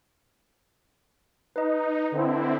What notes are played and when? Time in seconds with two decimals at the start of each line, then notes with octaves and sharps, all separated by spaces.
1.56 D#4 B4 D#5
2.12 D3 C4 E4